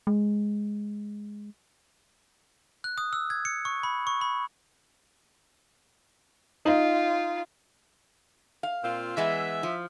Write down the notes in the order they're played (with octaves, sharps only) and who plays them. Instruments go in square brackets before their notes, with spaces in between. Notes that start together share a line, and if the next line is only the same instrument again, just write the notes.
[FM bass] G#3
[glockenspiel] F#6
D#6
E6
G#6
C#7
C#6
B5
C#6
B5
[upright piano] D#4 [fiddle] F4
[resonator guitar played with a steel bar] F5
[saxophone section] A#2 C4 F4
[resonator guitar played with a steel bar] E3 G#3 B3 [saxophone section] E5
[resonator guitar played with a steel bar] F3